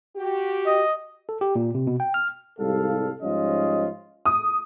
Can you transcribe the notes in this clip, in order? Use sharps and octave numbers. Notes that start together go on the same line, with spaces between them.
F#4 G4
D#5
A4
G4
A#2
C3
B2
G5
F6
C2 G#2 G3 A4 F5
G#2 F3 G3 C#4 F4 D#5
D#6